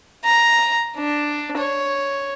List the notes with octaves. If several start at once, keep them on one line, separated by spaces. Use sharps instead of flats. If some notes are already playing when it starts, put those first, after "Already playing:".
A#5
D4
C#5